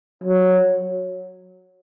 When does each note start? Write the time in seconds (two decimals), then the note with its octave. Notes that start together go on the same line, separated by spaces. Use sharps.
0.24 F#3